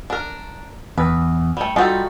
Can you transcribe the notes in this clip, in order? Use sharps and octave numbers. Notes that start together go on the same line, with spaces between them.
D4 A#4
E2 B4
G3 A3
G3 D#4 F4 F#4 A4